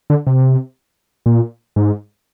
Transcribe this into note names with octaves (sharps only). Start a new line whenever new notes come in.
D3
C3
A#2
G#2